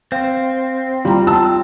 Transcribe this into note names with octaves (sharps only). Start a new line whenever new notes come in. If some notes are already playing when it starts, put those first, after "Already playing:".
C4 C5 F5
G3 F4 A#5
A5 E6